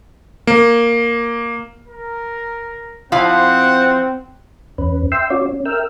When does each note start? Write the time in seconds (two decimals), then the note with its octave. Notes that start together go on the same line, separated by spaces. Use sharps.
0.47 A#3
1.87 A#4
3.12 F3 C4 E4 F5 F#5
4.78 E2 C#4 B4
5.12 E5 G5 C6 E6
5.30 C#4 F4 F#4 C#5 D5
5.49 C#4
5.65 A#4 E5 G5 E6 F6